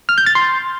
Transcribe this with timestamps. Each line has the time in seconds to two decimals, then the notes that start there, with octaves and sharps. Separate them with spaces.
0.09 F6
0.18 G6
0.26 A6
0.35 C6